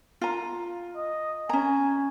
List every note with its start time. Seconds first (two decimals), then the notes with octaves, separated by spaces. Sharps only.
0.21 F4 A#5
0.96 D#5
1.49 C#4 G#5 A#5